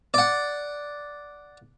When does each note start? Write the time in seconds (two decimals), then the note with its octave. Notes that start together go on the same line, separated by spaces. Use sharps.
0.14 D5 F#5